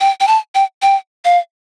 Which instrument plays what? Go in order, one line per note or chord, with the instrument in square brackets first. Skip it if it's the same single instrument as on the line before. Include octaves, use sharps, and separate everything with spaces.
[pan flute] G5
G5
A5
G5
G5
F5